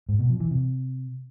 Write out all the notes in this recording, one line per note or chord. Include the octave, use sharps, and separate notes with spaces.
G#2
B2
F3
E3
C3